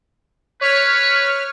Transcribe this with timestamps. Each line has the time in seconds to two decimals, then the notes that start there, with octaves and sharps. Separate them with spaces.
0.61 B4 C#5 F6